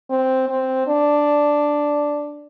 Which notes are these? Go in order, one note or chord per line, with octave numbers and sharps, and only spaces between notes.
C4
C4
D4